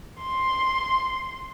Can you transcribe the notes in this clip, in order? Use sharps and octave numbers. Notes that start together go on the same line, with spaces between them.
C6